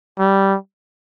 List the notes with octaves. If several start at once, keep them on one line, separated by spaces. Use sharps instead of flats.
G3